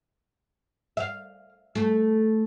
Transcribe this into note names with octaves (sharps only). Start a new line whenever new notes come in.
E5 F5
A3